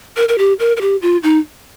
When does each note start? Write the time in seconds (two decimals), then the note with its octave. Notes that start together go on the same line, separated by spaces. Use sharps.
0.17 A#4
0.29 A#4
0.38 G4
0.60 A#4
0.77 A#4
0.81 G4
1.02 F4
1.23 D#4